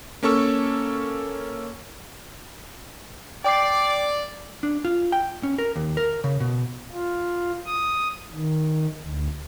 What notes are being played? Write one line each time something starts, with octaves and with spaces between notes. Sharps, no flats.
A#3 C#4 A4 C#6 E6
D5 G5 D6 C7
D4
F4
G5
C#4
A#4
D#2
A#4
C#3
B2
F4
D#6
D#3
D2